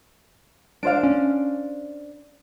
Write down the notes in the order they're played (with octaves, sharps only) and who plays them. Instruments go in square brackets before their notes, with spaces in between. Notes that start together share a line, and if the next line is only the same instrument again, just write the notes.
[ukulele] D4 C5 F5 [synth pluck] D7
[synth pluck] C#4